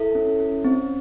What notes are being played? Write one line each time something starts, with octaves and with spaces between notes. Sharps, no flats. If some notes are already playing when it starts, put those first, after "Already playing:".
Already playing: E4 A4 E5
C#4
C#4
C4